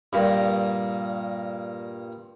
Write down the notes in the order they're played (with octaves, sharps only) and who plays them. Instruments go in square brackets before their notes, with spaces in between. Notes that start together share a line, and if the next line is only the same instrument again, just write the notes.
[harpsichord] G2 A#2